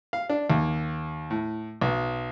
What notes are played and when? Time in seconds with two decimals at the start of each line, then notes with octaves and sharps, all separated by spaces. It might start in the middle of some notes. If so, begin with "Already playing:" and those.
0.13 F5
0.29 D4
0.50 D#2
1.31 A2
1.81 B1